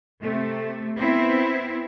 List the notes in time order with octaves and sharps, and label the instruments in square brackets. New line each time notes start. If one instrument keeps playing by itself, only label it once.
[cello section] C3 A3
B3 C4 E4